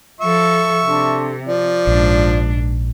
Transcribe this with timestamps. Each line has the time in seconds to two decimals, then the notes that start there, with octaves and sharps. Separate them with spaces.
0.21 F3 A4 E5 C#6
0.86 C3 D4 A4 C6
1.46 F3 D5
1.87 A#1 G#2 D4